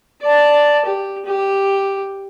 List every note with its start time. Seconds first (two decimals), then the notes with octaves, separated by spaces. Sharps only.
0.22 D5 A5
0.85 G4
1.25 G4